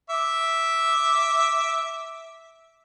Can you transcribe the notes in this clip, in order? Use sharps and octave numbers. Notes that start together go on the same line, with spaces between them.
E5 D6